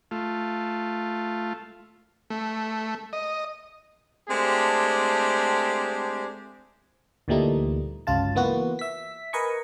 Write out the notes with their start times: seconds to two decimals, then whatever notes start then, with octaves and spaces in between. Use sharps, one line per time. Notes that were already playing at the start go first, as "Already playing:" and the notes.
0.11 A3 F4
2.30 A3
3.13 D#5
4.29 G#3 A3 C4 D4 G4
7.28 D2 A#2 E3 G3 A3 D#4
8.07 G1 C#2 F#3 F4 A5
8.36 E3 A#3 B3 F4 F#4
8.79 E5 B6
9.33 A#4 B4 D#5 G#5 C#6